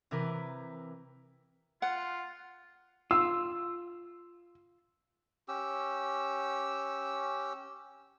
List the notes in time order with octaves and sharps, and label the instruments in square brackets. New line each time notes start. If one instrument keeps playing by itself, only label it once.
[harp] C3 E3 E4 A#4 B4
[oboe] F4 [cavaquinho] F#5
[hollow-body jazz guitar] F4 [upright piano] E6
[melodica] C#4 G4 E6